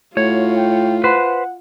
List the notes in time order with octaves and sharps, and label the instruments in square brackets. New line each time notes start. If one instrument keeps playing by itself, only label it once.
[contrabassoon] A2 [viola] F4 [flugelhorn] F#4 [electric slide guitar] C#5
[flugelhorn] G5
[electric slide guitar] B4 C5 [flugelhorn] F#5